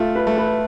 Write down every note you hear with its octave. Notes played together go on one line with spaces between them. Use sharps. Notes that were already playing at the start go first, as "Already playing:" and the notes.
Already playing: A3 F4
B4
A3
B4